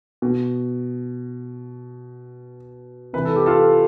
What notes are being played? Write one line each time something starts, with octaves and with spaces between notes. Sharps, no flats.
B2
C3 E3 B4
A4
G4
F4 A4